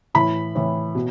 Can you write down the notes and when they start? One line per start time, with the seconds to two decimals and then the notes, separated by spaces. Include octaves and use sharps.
0.14 A2 E3 B5
0.55 A2 E3
0.95 B2